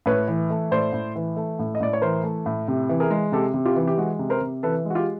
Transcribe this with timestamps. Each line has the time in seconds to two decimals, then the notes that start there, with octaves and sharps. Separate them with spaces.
0.06 A2 B4 C#5
0.28 E3
0.50 A3
0.71 A2 C5 D5
0.93 A2
1.16 E3
1.36 A3
1.59 A2
1.75 D#5
1.80 A2 D5
1.93 C#5
2.02 E3 A#4 C5
2.24 A3
2.46 A2
2.68 C3
2.89 E3
3.00 G#4 A#4
3.11 G#3
3.32 C3 G4 A4
3.54 C3
3.66 F4 G4
3.76 E3
3.87 G4
3.98 G#3 F#4
4.19 C3
4.30 A#4 C5
4.41 C3
4.63 E3 A4 B4
4.85 G#3
4.90 F#4
4.95 F4 G4